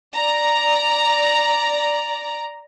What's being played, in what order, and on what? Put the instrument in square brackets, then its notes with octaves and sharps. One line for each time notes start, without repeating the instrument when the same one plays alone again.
[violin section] D5 A#5